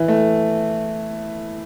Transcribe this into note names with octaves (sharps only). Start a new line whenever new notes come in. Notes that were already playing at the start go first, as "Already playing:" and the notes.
Already playing: E3
A3